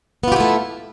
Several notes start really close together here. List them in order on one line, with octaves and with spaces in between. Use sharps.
B3 F4 G4 E4 A3